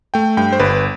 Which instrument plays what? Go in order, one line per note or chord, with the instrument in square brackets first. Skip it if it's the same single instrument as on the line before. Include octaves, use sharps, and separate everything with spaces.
[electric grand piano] A3 G5
G2 G5
C5
G1 B4